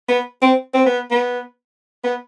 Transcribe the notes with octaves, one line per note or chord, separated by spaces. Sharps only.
B3
C4
C4
B3
B3
B3